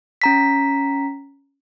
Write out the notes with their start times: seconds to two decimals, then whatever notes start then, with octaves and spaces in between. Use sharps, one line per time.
0.22 C#4 A#5 B6